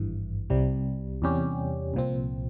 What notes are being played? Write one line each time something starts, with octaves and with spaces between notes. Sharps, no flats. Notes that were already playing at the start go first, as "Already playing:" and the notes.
Already playing: G#1 G2 E3
C2 C3 G3
E2 C3 G3 C#4 G4
C2 A#2 F3 C4